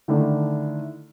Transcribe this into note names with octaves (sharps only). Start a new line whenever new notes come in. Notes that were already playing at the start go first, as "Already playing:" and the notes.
D3 D#3 A3 D4 E4